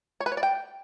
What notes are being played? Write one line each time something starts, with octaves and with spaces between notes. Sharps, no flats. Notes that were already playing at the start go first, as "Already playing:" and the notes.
C#5
B4
C#5
D5
G5